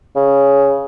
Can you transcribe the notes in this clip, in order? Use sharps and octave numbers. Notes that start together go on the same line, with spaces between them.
C#3